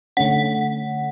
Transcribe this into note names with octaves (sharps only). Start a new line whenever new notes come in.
D3 A3 C#4 F#5